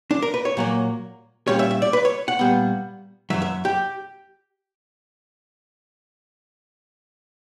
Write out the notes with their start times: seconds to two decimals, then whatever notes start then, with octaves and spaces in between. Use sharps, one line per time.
0.11 D4
0.22 A#4
0.34 B4
0.45 C#5
0.57 A#2 F#3 A#3
1.47 A#2 G3 C#4 C#5
1.59 E5
1.71 E5
1.82 D5
1.93 B4
2.05 C#5
2.28 F#5
2.39 A#2 G3 B3
3.30 F#2 C#3 F#3 E5
3.42 E5
3.65 G4